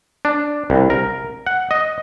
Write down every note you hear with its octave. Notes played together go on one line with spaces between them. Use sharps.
D4
C2
A#4
F#5
D#5